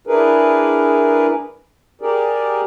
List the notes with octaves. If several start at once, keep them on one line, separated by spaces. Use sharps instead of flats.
D4 E4 G#4 A#4 B4
G4 G#4 A#4 D5